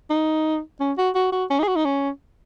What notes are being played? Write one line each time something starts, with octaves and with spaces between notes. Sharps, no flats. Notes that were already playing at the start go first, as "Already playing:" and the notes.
D#4
C#4
F#4
F#4
F#4
C#4
D#4
G#4
F#4
D#4
C#4